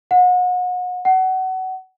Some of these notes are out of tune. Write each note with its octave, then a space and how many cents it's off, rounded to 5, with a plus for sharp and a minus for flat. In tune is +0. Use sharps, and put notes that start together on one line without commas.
F#5 -35
F#5 +25